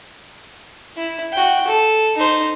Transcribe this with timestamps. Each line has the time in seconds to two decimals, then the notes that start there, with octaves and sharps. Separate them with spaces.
0.97 E4
1.33 F#4 G5
1.67 A4
2.17 D#4 C5